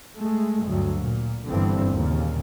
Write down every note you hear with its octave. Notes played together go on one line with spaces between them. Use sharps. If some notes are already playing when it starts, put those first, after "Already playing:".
G#3 A3
D2 G2 F#3
A#2
G1 G2 D3 E3 G3 C4
D#2 A#2 C#3